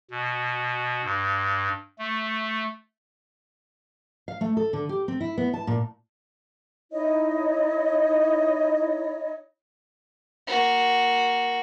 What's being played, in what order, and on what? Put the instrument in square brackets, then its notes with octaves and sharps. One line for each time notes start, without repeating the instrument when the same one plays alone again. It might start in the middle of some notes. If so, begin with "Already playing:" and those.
[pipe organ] B2
G2
A3
[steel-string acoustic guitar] F5
A3
A4
D3
G4
C4
E4
B3
A5
A#2
[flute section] D#4 E4 C#5 D#5
[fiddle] A#3 F#4